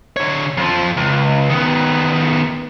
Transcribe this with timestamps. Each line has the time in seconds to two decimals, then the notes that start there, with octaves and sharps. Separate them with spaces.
0.17 D3 C#5
0.57 F2 F3
0.97 C#2
1.50 D#3 B3